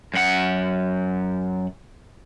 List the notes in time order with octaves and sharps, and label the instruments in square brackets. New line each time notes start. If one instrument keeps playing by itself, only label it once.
[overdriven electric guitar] F#2 F#5